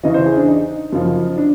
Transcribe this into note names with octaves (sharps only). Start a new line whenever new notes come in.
E2 C#3 E3 D#5
C5
G#4
D4
D#4
F#2 C#3 F3
D4